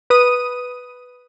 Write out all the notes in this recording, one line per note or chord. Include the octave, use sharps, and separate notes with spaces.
B4 D#6 D#7